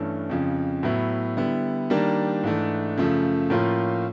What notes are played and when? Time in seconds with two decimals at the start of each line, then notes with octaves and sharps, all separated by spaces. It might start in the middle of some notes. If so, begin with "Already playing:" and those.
Already playing: G2 E3 A3 C#4
0.30 F2 C#3 F3
0.83 A2 F#3 B3 E4
1.37 D3 G3 B3 E4
1.90 D#3 G3 A#3 D4
2.43 G#2 E3 A3 D4
2.97 F#2 C#3 F3 A3
3.50 A2 F3 A#3 C#4 F4